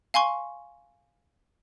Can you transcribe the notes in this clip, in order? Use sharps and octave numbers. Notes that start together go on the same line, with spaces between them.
F5 G#5 C6 C#6